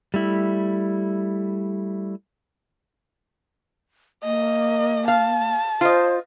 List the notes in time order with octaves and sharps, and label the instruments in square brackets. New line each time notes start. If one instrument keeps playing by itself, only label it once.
[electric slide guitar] G3 A3 E4
[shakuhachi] A#3 [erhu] D#5
[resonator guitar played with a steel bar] F5 [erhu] A5
[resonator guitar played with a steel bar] F4 D#5 [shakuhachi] C5